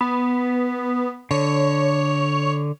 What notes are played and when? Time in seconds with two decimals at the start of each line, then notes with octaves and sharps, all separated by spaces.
0.01 B3
1.31 D3 C#5